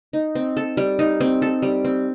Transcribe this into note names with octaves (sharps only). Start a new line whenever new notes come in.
D#4
C4
A4
G3
D#4
C4
A4
G3
C4